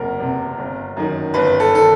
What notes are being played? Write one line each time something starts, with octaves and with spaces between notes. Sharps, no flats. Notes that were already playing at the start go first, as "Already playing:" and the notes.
Already playing: F#1 E2 C3 A#4
E2 C3
G1
F#2 D#3
G1 B4
A4
D#3 A4